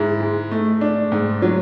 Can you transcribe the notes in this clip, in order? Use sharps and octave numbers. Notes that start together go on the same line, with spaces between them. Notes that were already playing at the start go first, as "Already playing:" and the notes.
Already playing: G#2 E4
G#3
A3
D4
G#2
F#3